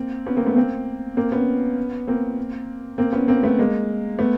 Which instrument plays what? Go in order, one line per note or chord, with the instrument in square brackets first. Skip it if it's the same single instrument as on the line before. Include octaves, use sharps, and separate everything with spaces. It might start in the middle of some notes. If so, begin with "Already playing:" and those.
Already playing: [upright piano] A#3 C4
B3 C#4
A#3 C4
A3 B3
A#3 C4
A#3 C4
B3 C#4
A#3 C4
A#3 C4
B3 C#4
A#3 C4
A3 B3
G#3 A#3
A3 B3